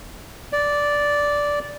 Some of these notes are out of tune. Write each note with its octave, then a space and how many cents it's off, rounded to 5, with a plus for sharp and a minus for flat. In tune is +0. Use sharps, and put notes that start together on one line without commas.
D5 -10